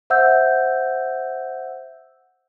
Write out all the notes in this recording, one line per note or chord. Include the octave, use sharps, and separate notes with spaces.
C5 E5 F#5 E6 G6